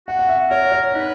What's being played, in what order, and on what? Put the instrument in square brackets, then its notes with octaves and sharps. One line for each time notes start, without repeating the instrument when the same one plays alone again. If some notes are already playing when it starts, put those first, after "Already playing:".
[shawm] F#4 [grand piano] F#5
[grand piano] F#5
E5
[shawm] A#4 [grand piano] C#5
[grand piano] C#5
[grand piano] D#4 [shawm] B4